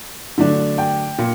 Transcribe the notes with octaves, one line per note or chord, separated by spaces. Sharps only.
D3 F#3 A3 D4
G5
A#2